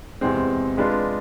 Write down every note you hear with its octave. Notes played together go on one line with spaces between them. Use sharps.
E2 C3 G#3 C4
G#3 D4 F4 B4